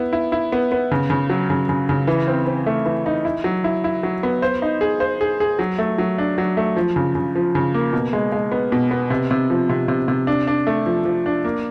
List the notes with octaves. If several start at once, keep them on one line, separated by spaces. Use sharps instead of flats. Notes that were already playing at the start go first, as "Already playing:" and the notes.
Already playing: B3 E4
E4
E4
B3
B3
C#3
C#3
F#3
C#3
C#3
C#3
E3
C4
C4
A3
E3
D#4
E4
F#3
E4
E4
F#3
B3
C5
D#4
G#4
C5
G#4
G#4
F#3
A3
F#3
D4
F#3
A3
F3
C#3
C#3
F3
C#3
A#3
B2
G#3
G#3
B3
B2
B3
C3
C3
F3
C3
C3
C3
D4
D4
A3
F3
F3
D4
A#3